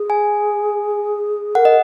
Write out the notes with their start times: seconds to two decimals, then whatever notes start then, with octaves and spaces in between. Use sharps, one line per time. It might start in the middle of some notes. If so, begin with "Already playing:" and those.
Already playing: G#4
0.10 G#5
1.55 A#4 F#5
1.65 D#5